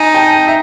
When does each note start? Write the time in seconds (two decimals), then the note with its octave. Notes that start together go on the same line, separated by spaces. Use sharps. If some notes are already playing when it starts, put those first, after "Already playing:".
Already playing: D#4 G#5 A#5
0.14 G5 A5
0.47 E5